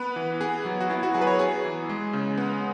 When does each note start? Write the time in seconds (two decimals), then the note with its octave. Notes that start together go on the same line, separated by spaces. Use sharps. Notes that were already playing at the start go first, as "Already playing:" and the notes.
Already playing: B3 B4
0.16 E3
0.41 B3 G#4
0.65 F#3
0.81 F#4
0.90 B3 E4
1.03 F#4
1.14 F#3 G#4
1.21 B4
1.27 C#5
1.39 B3 G#4
1.65 E3
1.89 G#3
2.13 C#3
2.38 B3